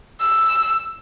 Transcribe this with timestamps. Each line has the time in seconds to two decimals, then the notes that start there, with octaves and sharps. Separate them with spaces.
0.21 E6